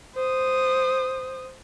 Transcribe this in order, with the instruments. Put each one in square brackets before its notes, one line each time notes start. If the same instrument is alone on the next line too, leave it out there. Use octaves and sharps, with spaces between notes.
[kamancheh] C5 D#6